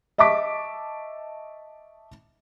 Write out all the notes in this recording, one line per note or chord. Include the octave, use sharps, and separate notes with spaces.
D#5 E5 A5 C#6 D6 B6